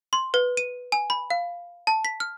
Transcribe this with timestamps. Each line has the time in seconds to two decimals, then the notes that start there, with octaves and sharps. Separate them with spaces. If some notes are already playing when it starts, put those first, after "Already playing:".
0.13 C6
0.34 B4
0.57 D#7
0.92 G#5
1.10 B5
1.30 F5
1.87 A5
2.05 B6
2.20 F6